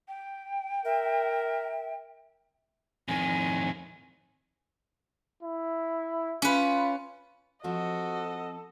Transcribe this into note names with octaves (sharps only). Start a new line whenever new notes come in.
G5
A#4 E5
F2 D#3 G#5
E4
C#4 F4 B4
F3 C4 F#4 A4 D#5 F#5